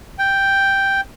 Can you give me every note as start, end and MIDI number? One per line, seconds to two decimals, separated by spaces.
0.19 1.01 79